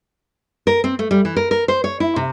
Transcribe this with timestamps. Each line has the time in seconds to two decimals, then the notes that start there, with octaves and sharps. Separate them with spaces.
0.67 A#4
0.84 C4
0.99 A3
1.11 G3
1.25 E3
1.37 A#4
1.51 A#4
1.68 C5
1.84 C#5
2.00 E4
2.16 C3